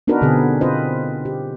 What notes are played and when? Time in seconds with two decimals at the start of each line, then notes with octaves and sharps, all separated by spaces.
0.08 B3 D4 D#4 F#4 A#4 B4
0.21 B2 D3 B3 C4 G#4
0.61 C4 F4 B4 C5 D#5
1.25 G4